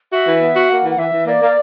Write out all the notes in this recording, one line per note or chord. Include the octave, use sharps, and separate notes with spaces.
F#4 E5
E3
B3
F#4
A#3 F#5
E3
F#5
E3 E5
E3
A#3 D5
A#3